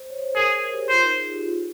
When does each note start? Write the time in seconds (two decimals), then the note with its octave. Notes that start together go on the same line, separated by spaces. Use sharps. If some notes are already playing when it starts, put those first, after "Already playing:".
Already playing: C5
0.10 C#5
0.23 C5
0.35 G#4 A#4
0.53 G#4
0.71 G4
0.89 F4 C5
1.03 D#4
1.17 G#4
1.30 G4
1.44 F4